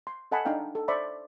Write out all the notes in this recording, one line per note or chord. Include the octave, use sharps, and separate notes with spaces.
C6
A4 D#5 F#5 G#5 A5 B5
D4 D#4 F5 G5 A#5
A4
C5 D5 E5 B5 C#6